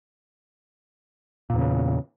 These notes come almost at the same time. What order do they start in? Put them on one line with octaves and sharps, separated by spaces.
A#2 E2 C#3